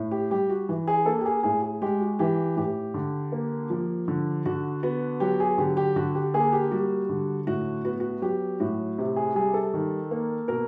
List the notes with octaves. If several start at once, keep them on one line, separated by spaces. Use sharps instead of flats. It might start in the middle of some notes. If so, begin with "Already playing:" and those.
Already playing: A2
G4
G3 G4
F#4
E3
G#4
A#3 A4
G4
G#4
A2 G#4
G#4
G#3 G4
F#4
E3 G4
A2 G4
D3
A#3
F3
D3
D3 F#4
B3 F#4
F#3 G4
G#4
D3 G4
G4
D3 F#4
G4
A#3 G#4
G4
G3 F#4
D3
A2 F#4
B3 F#4
F#4
F#3 G4
A2 F#4
C3
G#4
G3 G#4
A4
D#3
A#3
B2 A#4